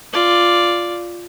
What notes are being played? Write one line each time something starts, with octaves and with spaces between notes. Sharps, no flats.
F4 D5